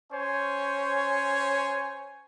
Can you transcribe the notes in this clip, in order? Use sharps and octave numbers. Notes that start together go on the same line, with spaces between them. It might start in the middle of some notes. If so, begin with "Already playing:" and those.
C#4 C5 C#5 G#5